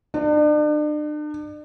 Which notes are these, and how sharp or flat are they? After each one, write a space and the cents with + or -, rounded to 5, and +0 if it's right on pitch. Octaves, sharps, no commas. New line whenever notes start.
D4 +40